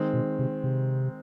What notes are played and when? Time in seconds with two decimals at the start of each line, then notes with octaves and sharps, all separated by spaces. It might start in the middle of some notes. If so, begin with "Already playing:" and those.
Already playing: D#3 G#3 C4
0.14 B2
0.39 C3
0.64 C3